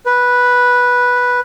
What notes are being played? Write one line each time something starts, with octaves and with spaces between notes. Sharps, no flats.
B4